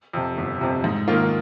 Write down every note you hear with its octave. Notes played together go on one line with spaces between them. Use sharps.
F2 C3
G1
F2 C3
G#2
D#3 A#3 F4